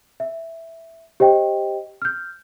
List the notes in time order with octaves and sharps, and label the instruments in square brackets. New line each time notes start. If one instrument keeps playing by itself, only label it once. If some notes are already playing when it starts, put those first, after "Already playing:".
[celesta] E5
G4 C5 D#5 G5
F6 G6